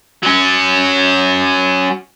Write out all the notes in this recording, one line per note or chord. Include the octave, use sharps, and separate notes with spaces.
F#3 C#4